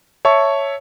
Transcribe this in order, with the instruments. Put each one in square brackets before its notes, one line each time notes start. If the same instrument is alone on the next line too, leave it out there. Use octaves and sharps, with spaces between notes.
[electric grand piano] C#5 E5 A5 C#6